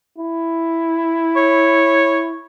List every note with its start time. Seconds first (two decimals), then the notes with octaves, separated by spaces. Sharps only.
0.18 E4
1.36 C#5